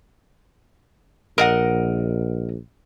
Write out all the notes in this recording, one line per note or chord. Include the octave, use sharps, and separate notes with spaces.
A#1 A#4 D#5 F#5